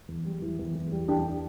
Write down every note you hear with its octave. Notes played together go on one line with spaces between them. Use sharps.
E2
G3
E3
E2
E2
G3
E3 D4 G4